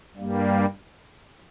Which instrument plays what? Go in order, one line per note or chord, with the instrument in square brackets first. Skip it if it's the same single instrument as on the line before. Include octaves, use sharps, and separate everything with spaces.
[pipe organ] G2 G3 A#3